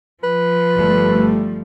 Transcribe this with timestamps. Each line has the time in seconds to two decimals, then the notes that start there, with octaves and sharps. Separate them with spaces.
0.23 F3 B4
0.75 G1 G3 A3